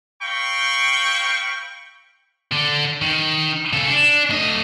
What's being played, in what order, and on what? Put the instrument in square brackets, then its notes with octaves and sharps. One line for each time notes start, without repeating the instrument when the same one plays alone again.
[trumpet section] C4 F5 G5 B5 C#6
[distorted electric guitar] D3
D#3
C#3 A4
D4
A2 D#5